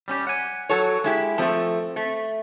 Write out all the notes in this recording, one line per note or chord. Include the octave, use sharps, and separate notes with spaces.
G3 C#4 G4
F#5 G#5
F#3 A4 C#5
G#3 E4 G4
F3 A3 C4 A4
A3